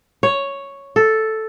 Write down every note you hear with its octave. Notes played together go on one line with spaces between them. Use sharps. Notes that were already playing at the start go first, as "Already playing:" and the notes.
C#5
A4